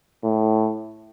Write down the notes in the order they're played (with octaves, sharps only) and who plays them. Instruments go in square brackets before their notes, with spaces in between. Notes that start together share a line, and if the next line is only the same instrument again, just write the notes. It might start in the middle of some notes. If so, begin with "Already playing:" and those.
[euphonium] A2